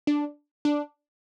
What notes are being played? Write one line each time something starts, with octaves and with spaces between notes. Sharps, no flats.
D4
D4